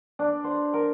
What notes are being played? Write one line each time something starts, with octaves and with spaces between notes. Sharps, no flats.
D4
C5
A#4